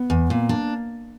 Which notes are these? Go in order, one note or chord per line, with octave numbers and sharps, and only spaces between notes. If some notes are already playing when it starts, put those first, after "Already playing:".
Already playing: B3
E2
A#2 A#3
D4